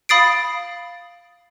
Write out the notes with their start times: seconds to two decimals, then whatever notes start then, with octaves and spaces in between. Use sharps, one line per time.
0.09 F5 B5 D#6 A6 C7 D7